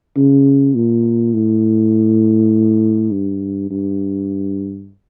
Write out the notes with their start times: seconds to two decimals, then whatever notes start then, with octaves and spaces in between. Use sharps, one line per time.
0.16 C#3
0.75 A#2
1.34 A2
3.11 G2
3.70 G2